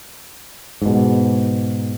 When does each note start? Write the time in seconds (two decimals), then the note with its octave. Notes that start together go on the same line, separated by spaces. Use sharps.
0.82 G#2 B2